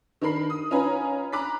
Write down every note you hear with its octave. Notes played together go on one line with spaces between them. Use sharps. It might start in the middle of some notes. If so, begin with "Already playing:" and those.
D#3 D4 A#4 B5 C7
D#6
C#4 D#4 F4 B4 G#5 A#5
A#5 B5 D6 F#6 B6